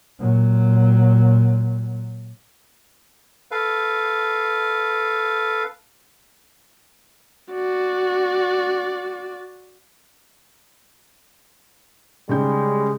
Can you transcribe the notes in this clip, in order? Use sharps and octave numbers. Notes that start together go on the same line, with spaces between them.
A#2 F#3
A4 B4 F5
F#4 D5
C#3 G3 G#3 D#4 G6